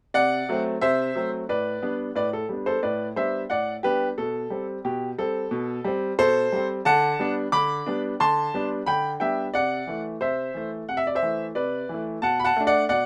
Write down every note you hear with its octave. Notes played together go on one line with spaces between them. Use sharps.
C3 D5 F#5
F#3 A3 C4
C3 C5 E5
F#3 A3 C4
A2 B4 D5
G3 B3 D4
A2 B4 D5
A4
G3 B3 D4
A4 C5
A2 B4 D5
G3 B3 D4 C5 E5
A2 D5 F#5
G3 B3 D4 G4 B4
B2 A4
G3 C4
B2 G4
G3 C4 A4
B2
G3 C4
B2 A4 C5
G3 C4
D3 F#5 A5
G3 B3 D4
D3 B5 D6
G3 B3 D4
D3 A5 C6
G3 B3 D4
D3 G5 B5
G3 B3 D4 E5 G5
C3 D5 F#5
E3 A3
C3 C5 E5
E3 A3
C3 F#5
E5
D5
C5 E5
E3 A3
C3 B4 D5
E3 A3
B2 F#5 A5
B5
F#5 A5
A3 D4
D5 F#5
B2 D5 F#5